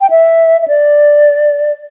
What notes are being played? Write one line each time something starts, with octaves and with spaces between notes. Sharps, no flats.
G5
E5
E5
D5